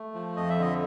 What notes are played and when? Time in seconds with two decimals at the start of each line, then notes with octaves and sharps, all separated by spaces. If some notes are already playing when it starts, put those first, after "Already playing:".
Already playing: A3
0.14 F3
0.37 F2 D#5
0.50 E5
0.58 D3 D#5